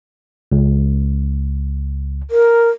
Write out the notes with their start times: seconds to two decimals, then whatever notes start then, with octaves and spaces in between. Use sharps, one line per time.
0.52 C#2
2.31 A#4